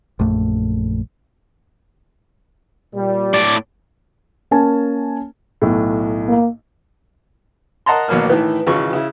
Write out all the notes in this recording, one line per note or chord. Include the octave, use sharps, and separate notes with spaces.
A#1 F#2 A3
A#2 G3
A2 D5
A#3 C#4 A#4 G#5 A5
B1 A2
A#3
A#4 D#5 F#5 A5 A#5 C6
A1 D#2 B2 F#3 A#3 F6
A2 D#3 E3
G#1 C#3 E3 F4 C#6
C#3 E4